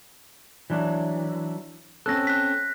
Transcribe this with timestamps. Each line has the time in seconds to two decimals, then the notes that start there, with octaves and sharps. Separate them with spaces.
0.70 E3 F#3 D4
2.06 C4 C#4 A4 F#6 A#6
2.27 F#6 B6